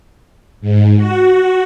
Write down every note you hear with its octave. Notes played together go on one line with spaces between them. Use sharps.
G#2
F#4